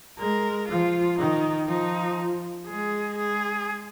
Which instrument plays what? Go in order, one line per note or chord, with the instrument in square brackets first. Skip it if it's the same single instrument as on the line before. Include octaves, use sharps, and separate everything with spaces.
[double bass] G#3 [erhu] A#4
[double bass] F3 [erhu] F4
[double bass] D#3 [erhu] D#4
[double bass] F3 [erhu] D#4
[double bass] G#3 [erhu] G#4
[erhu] G#4